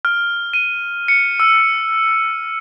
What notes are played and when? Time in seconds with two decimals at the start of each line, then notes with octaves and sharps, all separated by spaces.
0.05 F6
0.54 D#7
1.08 C#7
1.40 E6